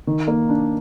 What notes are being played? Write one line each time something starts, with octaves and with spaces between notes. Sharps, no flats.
D#3
A#3
D4